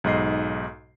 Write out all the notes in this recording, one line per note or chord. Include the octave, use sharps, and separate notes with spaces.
B1 G#2 D#5 C7